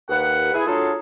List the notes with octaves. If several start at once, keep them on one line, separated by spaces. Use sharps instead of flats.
D#2 B4 F#5
E4 G#4
F#3 A3 D4 F4 G#4 A4